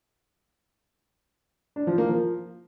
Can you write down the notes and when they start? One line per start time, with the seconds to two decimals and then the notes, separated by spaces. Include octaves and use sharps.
1.76 D4
1.87 F3
1.98 A#3
2.09 F3